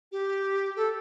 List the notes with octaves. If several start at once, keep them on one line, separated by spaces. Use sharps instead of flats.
G4
A4